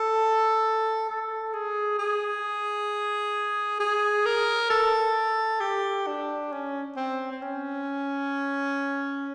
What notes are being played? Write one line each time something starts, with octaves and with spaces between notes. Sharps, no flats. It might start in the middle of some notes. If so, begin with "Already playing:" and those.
Already playing: A4
A4
G#4
G#4
G#4
A#4
A4
G4
D4
C#4
C4
C4
C#4